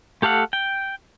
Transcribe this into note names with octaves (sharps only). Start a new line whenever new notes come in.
A3 G4 A4 F5 F#5
G5